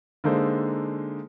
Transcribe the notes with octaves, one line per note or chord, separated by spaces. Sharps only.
D3 G#3 A#3 D#4 A4 C5